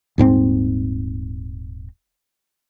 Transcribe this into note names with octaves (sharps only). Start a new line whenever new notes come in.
D#1 G#2 G3 C4